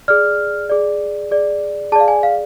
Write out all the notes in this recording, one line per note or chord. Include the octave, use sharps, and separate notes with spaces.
G#4 D5 F6
G#4 D5
G#4 D5
G#4 D5 F5 A5
G#5
F5